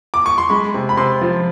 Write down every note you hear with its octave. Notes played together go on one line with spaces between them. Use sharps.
D6
C#6
C6
G#3 B5
C3
B5
C3 C6
F3